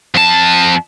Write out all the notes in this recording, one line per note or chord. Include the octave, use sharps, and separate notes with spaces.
F2 A5